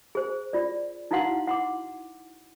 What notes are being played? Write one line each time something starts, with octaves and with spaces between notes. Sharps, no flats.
G#4 C5
F4 D5
D#4 E4 F#4 F5 F#5 C6
F#5 C6 D6